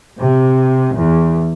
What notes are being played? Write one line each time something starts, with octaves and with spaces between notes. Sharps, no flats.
C3
E2